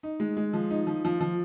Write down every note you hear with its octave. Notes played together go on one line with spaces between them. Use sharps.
D#4
G#3
G#3
F3
D#4
F3
F3
F3